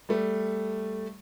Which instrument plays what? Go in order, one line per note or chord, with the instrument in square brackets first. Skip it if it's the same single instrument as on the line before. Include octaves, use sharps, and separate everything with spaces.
[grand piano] G3 A3